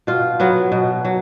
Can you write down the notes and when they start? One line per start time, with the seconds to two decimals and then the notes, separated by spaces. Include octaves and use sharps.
0.07 B2 F4
0.40 F#3 B3
0.72 B2
1.05 F#3